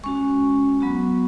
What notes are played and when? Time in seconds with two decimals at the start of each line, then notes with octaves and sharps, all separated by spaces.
0.04 G#3 C#4 F#4 C#6
0.80 F#3 B3 F#4